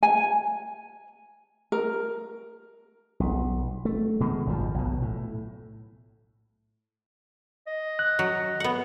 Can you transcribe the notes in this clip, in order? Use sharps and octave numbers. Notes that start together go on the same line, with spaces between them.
G#5
A#4
B1
A3
B2 D#3 G#3
G#1 F#2 F3
B1 B2
A2
D#5
F#6
F#3
B3 F#5